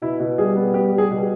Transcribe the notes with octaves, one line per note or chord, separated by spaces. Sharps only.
B2 E4
B2
G3 G#4
B3
G3 G4
G3
G#4
B2